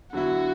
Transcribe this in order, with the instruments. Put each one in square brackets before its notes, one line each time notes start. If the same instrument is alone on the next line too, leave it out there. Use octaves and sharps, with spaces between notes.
[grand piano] D3 F#3 B3 E4 [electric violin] F#4